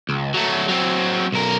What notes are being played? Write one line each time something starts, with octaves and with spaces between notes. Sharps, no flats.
C#2
F#3 A3
F#3 C4
B1 A#4